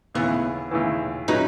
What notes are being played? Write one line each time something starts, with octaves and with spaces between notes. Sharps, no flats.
D#2 C#3 E3 B3
D#2 C#3 E3
F#3 C#4 D#4 G#4 B4